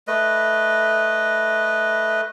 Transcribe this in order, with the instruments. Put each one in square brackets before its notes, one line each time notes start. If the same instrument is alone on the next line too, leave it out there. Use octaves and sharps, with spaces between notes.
[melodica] A3 B4 D#5